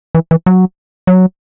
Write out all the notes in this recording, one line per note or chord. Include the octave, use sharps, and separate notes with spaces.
E3
E3
F#3
F#3